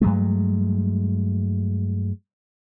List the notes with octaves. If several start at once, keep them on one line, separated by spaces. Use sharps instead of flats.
G2 F#3 G#3 A3